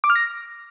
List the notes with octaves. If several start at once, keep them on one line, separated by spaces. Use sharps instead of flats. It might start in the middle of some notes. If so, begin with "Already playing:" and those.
D6
F6
A#6